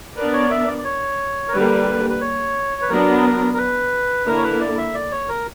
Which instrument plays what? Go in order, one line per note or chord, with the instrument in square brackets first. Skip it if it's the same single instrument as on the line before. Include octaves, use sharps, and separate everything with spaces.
[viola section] B3 D4 A#4 D5 [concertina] B4
[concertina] C#5
E5
D5
D5
C#5
A#4
[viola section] D3 G3 A#3 [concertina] B4
[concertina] B4
C#5
B4
[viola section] F#3 B3 D4 [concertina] A#4
[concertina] A#4
B4
[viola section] D3 A#3 E4 [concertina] A#4
[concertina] C#5
B4
D5
E5
D5
C#5
A#4